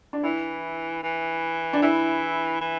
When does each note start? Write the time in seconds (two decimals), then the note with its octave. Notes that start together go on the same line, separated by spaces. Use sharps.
0.13 D4
0.23 E3 E4
1.03 E3
1.73 D4
1.82 E3 E4
2.61 E3